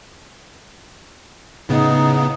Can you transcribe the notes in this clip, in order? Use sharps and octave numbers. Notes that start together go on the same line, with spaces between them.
A2 C#3 B3 D#4